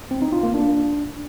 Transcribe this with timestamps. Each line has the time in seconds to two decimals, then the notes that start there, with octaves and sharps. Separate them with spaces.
0.11 C4
0.22 D#4
0.32 F4
0.43 A#3
0.54 D4